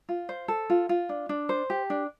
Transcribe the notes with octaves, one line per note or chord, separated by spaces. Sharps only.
F4
C5
A4
F4
F4
D4
D4
C5
G4
D4